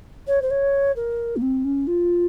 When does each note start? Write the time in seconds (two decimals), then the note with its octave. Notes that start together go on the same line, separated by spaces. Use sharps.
0.27 C#5
0.42 C5
0.50 C#5
0.96 A#4
1.36 A#3
1.42 C4
1.64 C#4
1.87 F4